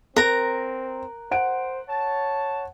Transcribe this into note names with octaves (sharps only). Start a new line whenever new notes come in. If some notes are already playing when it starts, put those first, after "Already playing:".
C4 A#4 A#5 F#6
C5 F#5 D7
C#5 A5